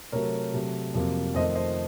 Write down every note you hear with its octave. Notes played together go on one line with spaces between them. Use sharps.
C3 F#3 A3 A#4 C#5
C3 F#3 A3
F2 C3 F#3 A#3
F2 D#3 A3 C5 D#5
C5 D#5